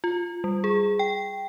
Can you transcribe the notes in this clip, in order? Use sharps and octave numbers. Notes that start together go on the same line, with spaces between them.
F4
G3
G#4
G5